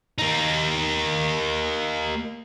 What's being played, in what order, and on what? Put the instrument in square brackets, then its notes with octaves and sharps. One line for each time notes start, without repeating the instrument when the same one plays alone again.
[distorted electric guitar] A#3 D#4